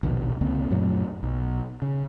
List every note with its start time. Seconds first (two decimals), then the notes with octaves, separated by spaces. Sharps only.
0.03 A#1 D#2 B2
0.41 C#2 D3 A#3 C4
0.70 F#2 A#2 F#3 A3
1.23 B1
1.82 C#3